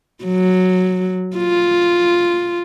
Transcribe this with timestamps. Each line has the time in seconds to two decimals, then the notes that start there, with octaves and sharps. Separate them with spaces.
0.24 F#3
1.37 F4